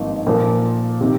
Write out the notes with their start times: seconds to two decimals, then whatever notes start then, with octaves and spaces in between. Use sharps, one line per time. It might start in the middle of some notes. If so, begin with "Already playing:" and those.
Already playing: G#1 G2 F3 A#3 D#4
0.27 A#2 F3 A#3
1.01 C3 D#3